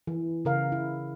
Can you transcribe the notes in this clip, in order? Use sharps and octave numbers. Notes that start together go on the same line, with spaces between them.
E3
C#3 A#4 F5
E4